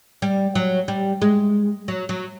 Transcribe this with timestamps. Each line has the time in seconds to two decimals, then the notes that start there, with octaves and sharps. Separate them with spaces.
0.22 G3
0.55 F#3
0.88 G3
1.22 G#3
1.88 F#3
2.09 F#3